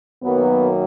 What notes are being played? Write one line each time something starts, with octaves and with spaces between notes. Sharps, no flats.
F#2 D#3 F#3 A#3 B3